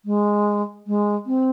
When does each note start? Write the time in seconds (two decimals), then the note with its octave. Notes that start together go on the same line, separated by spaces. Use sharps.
0.05 G#3
0.87 G#3
1.27 C4